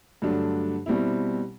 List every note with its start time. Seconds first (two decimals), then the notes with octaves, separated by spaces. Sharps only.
0.22 G2 D3 F#3 A3 D4
0.86 B2 G3 C4 E4